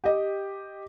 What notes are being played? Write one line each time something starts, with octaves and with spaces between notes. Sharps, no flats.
G4 D#5